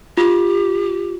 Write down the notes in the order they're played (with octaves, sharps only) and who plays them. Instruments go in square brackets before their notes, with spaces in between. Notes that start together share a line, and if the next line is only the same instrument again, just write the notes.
[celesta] F4 [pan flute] G4